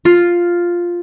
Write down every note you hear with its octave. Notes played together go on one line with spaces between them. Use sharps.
F4